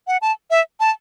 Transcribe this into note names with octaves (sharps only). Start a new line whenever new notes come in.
F#5
A5
E5
A5